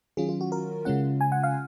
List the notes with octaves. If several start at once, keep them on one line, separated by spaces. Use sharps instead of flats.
D#3 F#3 C#4 F4 G#4
F4
F#4
A#4
C#3 G#3 C#4 F4 F#5
G#5
F#5
F5